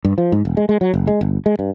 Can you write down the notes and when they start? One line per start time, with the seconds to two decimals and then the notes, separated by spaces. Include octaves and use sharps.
0.05 G2
0.18 F3
0.32 G#2
0.45 E1
0.57 G#3
0.69 G#3
0.81 F#3
0.94 F#1
1.07 G#3
1.21 G1
1.46 G#3
1.59 G2